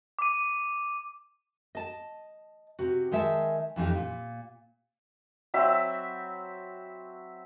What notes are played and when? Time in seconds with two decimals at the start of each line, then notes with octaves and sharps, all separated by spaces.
0.19 D6 D#7
1.75 D#5 A5
2.79 C3 F#4
3.11 D#3 G#3 E5 G#5 A5
3.76 F2 E3 C#4 D#4 G4
3.95 A#2
5.54 F#3 C4 E5 B5